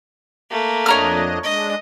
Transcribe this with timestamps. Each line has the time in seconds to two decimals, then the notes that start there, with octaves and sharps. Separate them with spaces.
0.51 A3 A#3
0.86 F2 D4 C#5 D#5 A#5 F6
1.44 G#3 D4 D#5